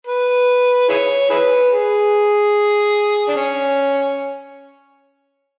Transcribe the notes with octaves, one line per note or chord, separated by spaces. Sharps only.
B4
E4 G#4 C#5
E4 G#4 B4
G#4
D4
C#4